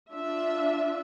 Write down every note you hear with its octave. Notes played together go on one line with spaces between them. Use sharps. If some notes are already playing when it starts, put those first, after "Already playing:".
D4 F4 E5